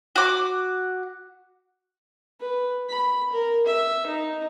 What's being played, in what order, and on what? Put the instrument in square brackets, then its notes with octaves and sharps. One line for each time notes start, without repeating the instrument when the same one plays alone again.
[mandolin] F#4 D6
[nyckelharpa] B4
B5
A#4
E5
D#4